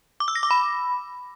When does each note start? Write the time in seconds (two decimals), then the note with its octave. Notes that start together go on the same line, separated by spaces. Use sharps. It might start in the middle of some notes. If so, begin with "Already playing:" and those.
0.20 D6
0.28 E6
0.35 A#6
0.43 D6
0.51 B5